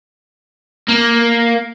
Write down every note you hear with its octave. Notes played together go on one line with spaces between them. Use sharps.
A#3